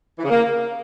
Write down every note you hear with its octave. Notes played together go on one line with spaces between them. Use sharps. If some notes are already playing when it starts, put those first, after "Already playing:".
E3
C#3
A#3